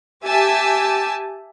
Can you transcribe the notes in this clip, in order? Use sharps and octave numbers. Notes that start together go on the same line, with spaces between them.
G4 E5 G#5 A5